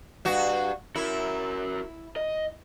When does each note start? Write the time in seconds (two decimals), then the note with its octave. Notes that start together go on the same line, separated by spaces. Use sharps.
0.25 G2 F#4
0.96 E4 F#4 A#4
2.16 D#5